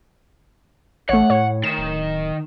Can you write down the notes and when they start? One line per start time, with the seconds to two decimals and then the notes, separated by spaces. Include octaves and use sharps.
1.09 A1 A3 C#5 F#5
1.30 A2 C#5
1.64 D#3 E7
1.78 D1